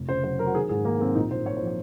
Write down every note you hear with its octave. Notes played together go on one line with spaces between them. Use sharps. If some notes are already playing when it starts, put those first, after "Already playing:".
Already playing: F1
C#3 C5
F#3 C5
F#3 A#4
F#4
D#3 G#4
G#2 G#4
D#3 A#3
F#3 C4
A#1 D#4
A#1 C5
A#2 C#5
C5
F3
C#5